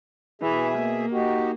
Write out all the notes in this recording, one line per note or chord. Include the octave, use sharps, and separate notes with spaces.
B2 E3 G#4 E5
A#3
D#4 F#4 G4